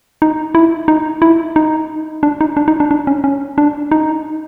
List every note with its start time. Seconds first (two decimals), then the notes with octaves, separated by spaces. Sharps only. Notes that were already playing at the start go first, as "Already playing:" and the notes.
0.22 D#4
0.55 E4
0.88 D#4
1.22 E4
1.56 D#4
2.23 D4
2.41 D#4
2.57 D4
2.68 D#4
2.80 D4
2.91 D4
3.07 C#4
3.24 C#4
3.58 D4
3.91 D#4